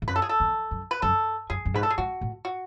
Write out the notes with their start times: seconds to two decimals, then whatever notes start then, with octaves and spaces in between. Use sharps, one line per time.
0.02 G#2
0.08 F#2 B4
0.16 A4
0.22 G#4
0.29 A4
0.40 E2
0.71 F#2
0.91 B4
1.02 F#2 A4
1.50 F#2 G#4
1.65 F#2
1.74 G#2 B4
1.83 A4
1.90 G#4
1.98 G#2 F#4
2.21 A2
2.45 F#4